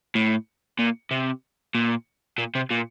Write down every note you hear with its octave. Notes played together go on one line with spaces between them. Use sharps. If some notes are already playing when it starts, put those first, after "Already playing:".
A2
A#2
C3
A#2
A#2
C3
A#2